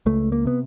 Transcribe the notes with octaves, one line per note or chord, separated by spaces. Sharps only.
C#2 A3
A#3
C3 B3